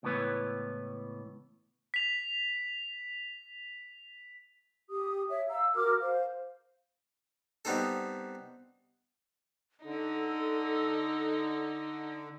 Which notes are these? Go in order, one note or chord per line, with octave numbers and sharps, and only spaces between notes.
C#2 A2 E3 B3 B4 C#5
B6 F7
G4 D#6
C#5 E5
F5 A#5 E6
F#4 A#4 D6 F6
C5 F5
G3 B3 C4 D#4 A4
D3 D#4 A4